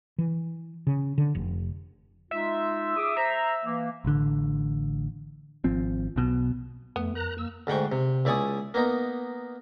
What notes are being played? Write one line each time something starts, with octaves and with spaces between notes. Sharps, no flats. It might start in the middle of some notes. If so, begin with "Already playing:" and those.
E3
C#3
D3
F1
G#3 D#4 F4 E5
G#4 D6 D#6
C5 E5 A#5
E3 A#3
A1 D3
G#1 F3 C4
B1 B2
F2 A3 B3
A#4 A#5 F#6
A#3 E6
D2 G#2 F#5 G5 C#6
C3
C#2 E4 D5 G#5 C#6 D#6
A#3 B3 D#4